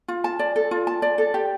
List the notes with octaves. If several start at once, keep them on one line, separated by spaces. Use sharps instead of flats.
F4
A5
D5
A4
F4
A5
D5
A4
G4